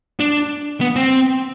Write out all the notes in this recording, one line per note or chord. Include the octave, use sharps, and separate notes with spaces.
D4
B3
C4